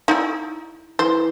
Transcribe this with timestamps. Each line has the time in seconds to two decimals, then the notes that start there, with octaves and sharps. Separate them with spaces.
0.08 D#4 E4
0.99 E3 C5